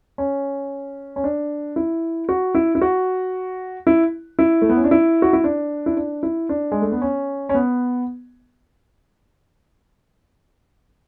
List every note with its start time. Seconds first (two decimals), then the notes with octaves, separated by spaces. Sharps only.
0.18 C#4
1.16 C#4
1.24 D4
1.76 E4
2.29 F#4
2.55 E4
2.75 E4
2.81 F#4
3.87 E4
4.39 E4
4.62 A3
4.69 B3
4.77 C#4
4.84 D4
4.91 E4
5.22 F#4
5.33 E4
5.44 D4
5.86 E4
5.97 D4
6.23 E4
6.49 D4
6.72 G#3
6.82 A3
6.92 B3
7.02 C#4
7.49 C#4
7.54 B3